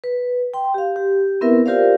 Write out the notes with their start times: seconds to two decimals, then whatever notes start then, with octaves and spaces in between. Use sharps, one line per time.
0.04 B4
0.54 G5 C6
0.74 G4 F5
0.96 G4
1.41 B3 C4 E4 A#4 B4 E5
1.66 F4 G4 A#4 C5 D5 F5